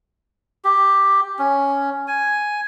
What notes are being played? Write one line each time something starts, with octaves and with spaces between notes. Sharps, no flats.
G4
C#4
G#5